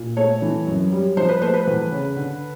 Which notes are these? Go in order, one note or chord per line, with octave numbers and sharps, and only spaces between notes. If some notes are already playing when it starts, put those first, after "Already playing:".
Already playing: A#2
A3 C#5
E3
F#2
G3
F3 C5
B4
A3 C5
B4
E2
C#3
D3